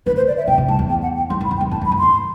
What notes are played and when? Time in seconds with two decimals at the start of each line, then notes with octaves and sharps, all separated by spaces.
0.06 D3 B4
0.16 C5
0.27 D5
0.37 E5
0.47 C3 G5
0.58 B2
0.68 G2 A5
0.79 E2
0.89 G5
1.02 F#5
1.16 G5
1.29 F#2 C6
1.41 F#2 B5
1.51 E2
1.57 G5
1.61 F#2
1.71 F#2 A5
1.81 G2 B5
1.92 F#2
1.98 E2 C6